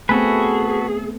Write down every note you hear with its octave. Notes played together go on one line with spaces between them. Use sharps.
A3 B3 C4 F#4 G#4 A4 B4